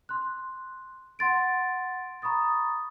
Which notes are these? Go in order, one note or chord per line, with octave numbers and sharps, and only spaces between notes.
C6 F#6
F#5 C6 A6 D7
A#5 B5 C#6 D#6 A6